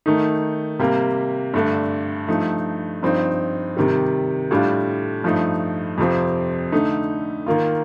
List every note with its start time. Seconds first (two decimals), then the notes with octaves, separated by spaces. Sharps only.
0.06 D#3 A3 D#4
0.79 C3 G3 A#3
1.54 G2 D3 A3 D4
2.28 G2 F3 A3 D#4
3.03 G2 F3 C4 D#4
3.76 C3 D#3 G3
4.51 A2 G3 D4 F4
5.24 G2 F3 A3 D#4
5.98 F2 C3 F3 C4
6.72 D3 A3 D#4
7.46 D#3 A#3 F4